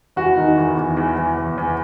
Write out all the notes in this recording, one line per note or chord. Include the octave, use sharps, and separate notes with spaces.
E2 F#4
D#3
E2
E2
E2
E2
E2
E2